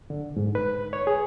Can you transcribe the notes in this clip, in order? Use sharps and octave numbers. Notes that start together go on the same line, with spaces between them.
D3
G#2
B4
C#5
G#4